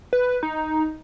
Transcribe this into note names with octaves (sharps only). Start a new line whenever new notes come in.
B4
D#4